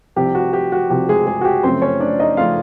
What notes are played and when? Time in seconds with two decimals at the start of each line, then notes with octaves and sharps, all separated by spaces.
0.16 C2 C3 F3 G4
0.35 F#4
0.53 G4
0.72 F#4
0.90 C2 C3 F3 G4
1.09 G#3 G#4
1.27 G#3 G#4
1.41 F#4
1.45 G4
1.63 F#2 C#3 F3 A3 C4 C5
1.82 C#4 C#5
2.00 D4 D5
2.19 D#4 D#5
2.37 C#3 F3 A3 F4 F5